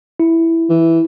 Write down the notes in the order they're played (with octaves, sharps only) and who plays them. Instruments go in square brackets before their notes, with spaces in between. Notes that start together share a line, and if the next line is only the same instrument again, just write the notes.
[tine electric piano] E4
[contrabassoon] E3